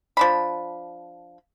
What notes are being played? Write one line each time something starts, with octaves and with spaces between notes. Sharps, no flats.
F3 D4 B5